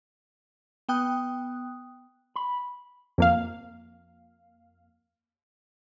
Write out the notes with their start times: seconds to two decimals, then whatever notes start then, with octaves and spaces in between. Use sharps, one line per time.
0.89 B3 G5 D#6 F#6
2.36 B5
3.18 F2 A#3 F5